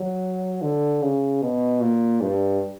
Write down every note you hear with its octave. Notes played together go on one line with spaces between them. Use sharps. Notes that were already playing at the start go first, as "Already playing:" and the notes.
Already playing: F#3
D3
C#3
B2
A#2
G2